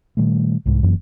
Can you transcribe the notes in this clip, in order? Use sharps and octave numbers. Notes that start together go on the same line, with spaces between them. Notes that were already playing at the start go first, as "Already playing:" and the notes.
A#2 D#3 G3 A3
C2 G#2
F1 F#2 E3 A#3